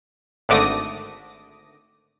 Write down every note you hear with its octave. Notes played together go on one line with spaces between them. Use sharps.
G#1 D3 A3 D6 D#6 A#6